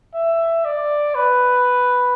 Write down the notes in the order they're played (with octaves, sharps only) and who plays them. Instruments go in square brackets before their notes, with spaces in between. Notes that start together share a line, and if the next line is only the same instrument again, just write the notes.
[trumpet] E5
D5
B4